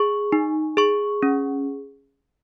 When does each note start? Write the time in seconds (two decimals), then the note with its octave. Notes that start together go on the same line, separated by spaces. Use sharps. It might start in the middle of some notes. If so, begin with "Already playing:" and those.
Already playing: G#4 C#6
0.32 D#4
0.77 G#4 C#6
1.23 C#4